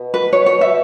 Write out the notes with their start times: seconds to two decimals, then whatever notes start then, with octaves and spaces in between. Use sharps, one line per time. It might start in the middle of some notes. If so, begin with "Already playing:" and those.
Already playing: B2
0.14 B4
0.33 C#5
0.46 C#5
0.61 E5